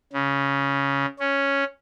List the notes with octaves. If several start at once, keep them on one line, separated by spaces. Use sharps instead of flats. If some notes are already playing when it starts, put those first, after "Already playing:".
C#3
C#4